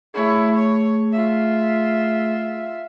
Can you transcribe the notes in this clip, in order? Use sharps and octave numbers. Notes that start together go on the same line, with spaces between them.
A3 E4 G#4 C#5
C#5
F4 E5